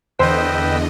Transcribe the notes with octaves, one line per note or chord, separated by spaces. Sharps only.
E2 D3 B4 C5 D#5 G5 E6